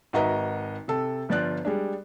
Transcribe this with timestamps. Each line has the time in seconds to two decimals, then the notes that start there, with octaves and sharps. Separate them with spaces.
0.13 G#1 F#4 B4 D#5 E5 A#5
0.88 C3 A4
1.29 G1 F3 F4 D5 F#6
1.65 G3 G#3 D4